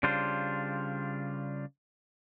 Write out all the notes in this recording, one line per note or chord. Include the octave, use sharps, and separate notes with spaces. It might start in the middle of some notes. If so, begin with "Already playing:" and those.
C#3 G3 D4 F4 C5